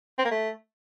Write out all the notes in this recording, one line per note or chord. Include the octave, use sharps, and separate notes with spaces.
C4
A#3
A3